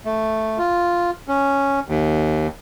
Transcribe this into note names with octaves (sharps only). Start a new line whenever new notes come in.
A3
F4
C#4
D#2